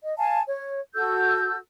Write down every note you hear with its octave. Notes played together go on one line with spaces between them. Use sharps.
D#5
F5 G#5 A5
C#5
F#4 A4 E6 G6